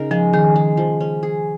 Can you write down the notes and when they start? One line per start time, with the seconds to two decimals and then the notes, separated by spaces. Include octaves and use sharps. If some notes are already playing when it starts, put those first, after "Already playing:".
Already playing: C#3 D#4 A#4
0.11 F3 G#3
0.33 D#3 G#4
0.56 G#3
0.77 F3
1.00 C#4
1.23 G#4